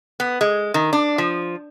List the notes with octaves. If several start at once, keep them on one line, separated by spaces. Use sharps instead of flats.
B3
G#3
D#3
D4
F3